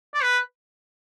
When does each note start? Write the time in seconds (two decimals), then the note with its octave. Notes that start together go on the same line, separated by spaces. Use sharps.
0.14 D5
0.22 B4